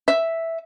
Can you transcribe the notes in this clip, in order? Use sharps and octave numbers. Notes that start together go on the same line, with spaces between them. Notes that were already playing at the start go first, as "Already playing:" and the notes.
E5